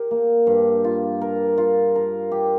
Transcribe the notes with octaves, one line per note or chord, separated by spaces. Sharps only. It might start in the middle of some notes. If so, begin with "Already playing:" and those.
Already playing: G4 A#4
A#3
G2
F4
A#4
F4
A#4
G4